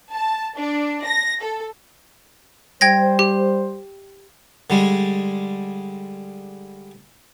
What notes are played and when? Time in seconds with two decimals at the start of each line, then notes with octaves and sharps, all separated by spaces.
0.12 A5
0.58 D4
1.04 A#6
1.42 A4
2.81 G3 C5 G5 G#6 A#6
3.19 G4
4.70 D3 G3 G#3